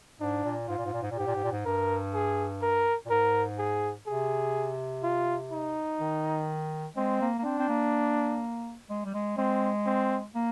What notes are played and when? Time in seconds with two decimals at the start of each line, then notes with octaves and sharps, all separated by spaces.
0.20 G#2 D4
0.44 A#2
0.68 G#2 F4
0.78 A#2
0.85 G#2
0.93 A#2
1.02 G#2
1.10 A#2
1.17 G#2 G4
1.26 A#2
1.35 G#2
1.43 A#2
1.52 G#2
1.65 G2 A#4
2.14 G#4
2.62 A#4
3.05 A#2
3.10 G#2 A#4
3.58 G#4
4.07 C3 G#4
5.03 F4
5.52 D#4
5.99 D#3
6.96 G#3 C4
7.21 A#3
7.38 A#3
7.45 C4 D4
7.58 C4
7.69 A#3
8.90 G#3
9.05 G3
9.14 G#3
9.38 G#3 C4
9.86 C4
10.35 A#3